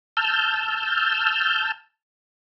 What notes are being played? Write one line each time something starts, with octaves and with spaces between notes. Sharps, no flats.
A5 E6 F6 G6